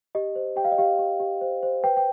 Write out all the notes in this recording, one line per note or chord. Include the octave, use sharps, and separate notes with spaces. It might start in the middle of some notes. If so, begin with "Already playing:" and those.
G4 D#5
C5
G4 G5
F5
D#5
G4 F5
G4
G4
C5
C5
B4 G5
G5